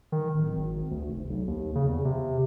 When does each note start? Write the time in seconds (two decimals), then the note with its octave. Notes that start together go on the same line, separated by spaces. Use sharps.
0.12 D#3
0.34 D1
0.54 G#1
0.91 D2
1.08 F1
1.30 B1
1.48 D#2
1.75 C#3
1.89 E2
2.05 C3